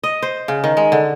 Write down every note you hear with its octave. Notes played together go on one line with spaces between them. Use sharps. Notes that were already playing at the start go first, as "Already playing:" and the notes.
D#5
C5
C#3
D#3
G#3
D3